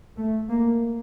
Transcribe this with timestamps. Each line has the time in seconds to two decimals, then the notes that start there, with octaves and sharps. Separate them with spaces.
0.16 A3
0.50 A#3